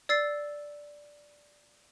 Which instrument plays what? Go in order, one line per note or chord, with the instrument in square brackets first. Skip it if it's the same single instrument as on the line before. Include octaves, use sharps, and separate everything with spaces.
[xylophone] D5 E6 A6 C7